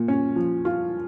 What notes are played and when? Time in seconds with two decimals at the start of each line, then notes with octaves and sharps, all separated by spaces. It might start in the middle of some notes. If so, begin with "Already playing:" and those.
Already playing: A#2
0.08 C#4
0.36 F3
0.65 F4